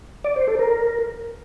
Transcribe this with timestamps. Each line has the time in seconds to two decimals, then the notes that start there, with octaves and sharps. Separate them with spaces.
0.24 D5
0.36 C5
0.48 A4
0.59 A#4